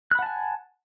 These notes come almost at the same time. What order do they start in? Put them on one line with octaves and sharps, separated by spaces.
F#6 B5 F#5 A5 G#5